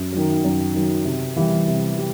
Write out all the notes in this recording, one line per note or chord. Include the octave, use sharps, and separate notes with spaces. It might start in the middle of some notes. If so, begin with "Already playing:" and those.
Already playing: F#2
D#3 F#3
F#2
D#3 F#3
C3
E3 G3
C3
G3